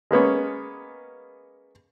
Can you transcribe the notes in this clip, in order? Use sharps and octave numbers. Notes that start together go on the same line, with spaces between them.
G#3 A#3 B3 C#4